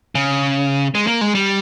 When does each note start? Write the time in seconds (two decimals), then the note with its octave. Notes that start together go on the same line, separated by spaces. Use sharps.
0.15 C#3
0.95 G#3
1.07 A#3
1.21 G#3
1.35 G3